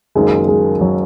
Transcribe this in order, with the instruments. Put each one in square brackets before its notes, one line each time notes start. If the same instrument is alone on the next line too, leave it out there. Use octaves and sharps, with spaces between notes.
[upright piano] F#1 F#2 D#3 A#3 [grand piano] G#3
[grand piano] G#3
F#3